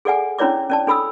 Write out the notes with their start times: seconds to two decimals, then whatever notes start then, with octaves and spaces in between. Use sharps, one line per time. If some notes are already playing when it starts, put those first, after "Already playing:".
0.05 G#4 A4 D5 F#5 G#5
0.39 C#4 D4 E4 C#5 D5 D6
0.70 C#4 D5 A5
0.87 D4 A4 B5 D#6 E6